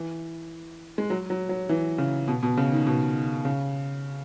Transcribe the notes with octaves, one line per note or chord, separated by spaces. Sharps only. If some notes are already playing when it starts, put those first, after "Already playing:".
Already playing: E3
G#3
F#3
F#3
F#3
E3
C#3
B2
B2
C#3
D#3
B2
C#3